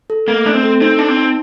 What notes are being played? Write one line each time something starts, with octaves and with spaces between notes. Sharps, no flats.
A4
A3 A#3
A3 D4
C4
A4
C4 D#4
D4 A5
C4
D#4